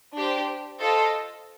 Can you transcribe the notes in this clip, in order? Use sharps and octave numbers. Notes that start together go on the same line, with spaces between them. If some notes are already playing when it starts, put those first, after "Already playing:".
D4 G4 C5
F4 A4 C5 D#5